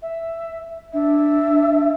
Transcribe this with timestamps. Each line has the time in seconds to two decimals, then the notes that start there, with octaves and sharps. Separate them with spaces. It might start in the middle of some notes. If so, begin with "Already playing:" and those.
0.02 E5
0.93 D4 E5